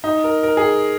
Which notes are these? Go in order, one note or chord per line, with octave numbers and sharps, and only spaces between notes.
D#4
A#4
A#4
G#4